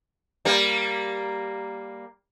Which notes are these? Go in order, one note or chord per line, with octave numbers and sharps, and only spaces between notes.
G3 A#3 A#4